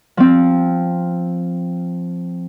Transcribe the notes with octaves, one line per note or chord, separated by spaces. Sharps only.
F3 C4